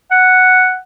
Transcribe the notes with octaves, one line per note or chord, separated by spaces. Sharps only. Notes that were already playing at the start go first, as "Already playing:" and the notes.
F#5